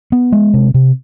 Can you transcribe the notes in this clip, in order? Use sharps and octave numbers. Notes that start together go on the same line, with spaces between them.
B3
G#3
C3
C3